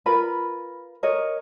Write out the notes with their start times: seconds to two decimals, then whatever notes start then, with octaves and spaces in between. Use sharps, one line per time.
0.06 F4 A#4 B4 B5
1.03 A#4 C#5 D#5